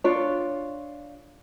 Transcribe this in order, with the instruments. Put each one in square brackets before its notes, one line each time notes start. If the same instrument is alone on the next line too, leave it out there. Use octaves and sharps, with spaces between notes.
[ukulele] D4 F4 C#5